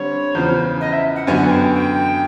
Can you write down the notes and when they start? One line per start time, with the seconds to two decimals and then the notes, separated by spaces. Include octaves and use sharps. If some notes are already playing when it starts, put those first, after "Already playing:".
Already playing: D3 G3 C4 C#5
0.35 E2 C#3 F3 C5
0.81 D#5
0.92 E5
1.16 F#5
1.27 F#2 D3 F#3 B3 G#5
1.44 G#5
1.50 G5
1.74 G5